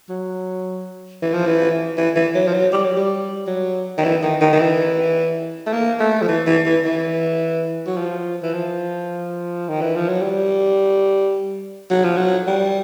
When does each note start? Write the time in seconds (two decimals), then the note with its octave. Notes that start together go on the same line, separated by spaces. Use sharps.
0.10 F#3
1.22 E3
1.33 F3
1.46 E3
1.98 E3
2.16 E3
2.35 F#3
2.47 F3
2.54 F#3
2.73 G3
2.85 F#3
2.97 G3
3.47 F#3
3.98 D#3
4.04 E3
4.22 D#3
4.41 D#3
4.53 D#3
4.60 E3
5.66 A3
5.73 A#3
6.00 A3
6.22 F3
6.28 E3
6.47 E3
6.66 E3
6.85 E3
7.87 F#3
7.97 F3
8.43 E3
8.54 F3
9.69 D#3
9.81 E3
9.96 F3
10.09 F#3
10.22 G3
11.91 F#3
12.04 F3
12.17 F#3
12.47 G3